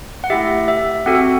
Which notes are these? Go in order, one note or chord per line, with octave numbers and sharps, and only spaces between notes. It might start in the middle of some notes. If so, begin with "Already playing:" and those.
F#5
A3 E4 G4 E5
E5
C4 F#4 A4 F#5